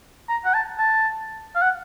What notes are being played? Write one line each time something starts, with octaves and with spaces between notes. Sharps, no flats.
A#5
F#5
A5
A5
F5
F#5